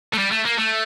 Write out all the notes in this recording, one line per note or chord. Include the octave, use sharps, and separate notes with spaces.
A3
G3
A3
A#3
A3